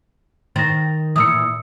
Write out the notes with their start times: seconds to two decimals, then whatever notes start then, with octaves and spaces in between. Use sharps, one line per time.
0.56 D#3 C5 A6 A#6
1.16 A#2 E3 D#6 E6 C#7